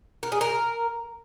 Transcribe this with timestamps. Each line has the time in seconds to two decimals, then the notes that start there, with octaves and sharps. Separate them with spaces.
0.23 A#4
0.32 G#4
0.41 A#4